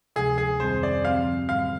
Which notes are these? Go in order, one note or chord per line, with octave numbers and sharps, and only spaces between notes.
D2 C3 F3 G#3 G#4
G#4
F2 D#3 G3 C4 C5
D5
D3 F3 C4 G4 F5
G#2 D#3 G3 F5